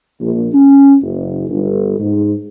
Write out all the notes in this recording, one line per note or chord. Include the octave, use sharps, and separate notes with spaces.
A#1
C#4
F#1
G1
G#2